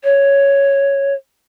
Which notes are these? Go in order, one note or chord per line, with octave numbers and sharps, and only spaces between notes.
C#5